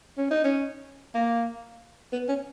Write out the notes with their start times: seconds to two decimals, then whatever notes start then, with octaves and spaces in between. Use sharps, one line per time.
0.17 C#4
0.30 D#4
0.44 C#4
1.14 A#3
2.12 B3
2.28 C#4